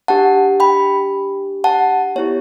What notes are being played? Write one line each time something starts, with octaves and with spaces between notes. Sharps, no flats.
D4 G4 F#5 A5
G5 B5
F#5 A5
B3 E4 G4 C#5